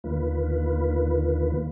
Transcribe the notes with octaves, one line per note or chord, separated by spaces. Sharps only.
D#2 D3 D#3 A#3 F4 B4